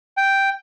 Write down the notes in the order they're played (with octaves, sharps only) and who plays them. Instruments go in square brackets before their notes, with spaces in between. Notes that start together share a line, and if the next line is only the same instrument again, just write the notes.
[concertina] G5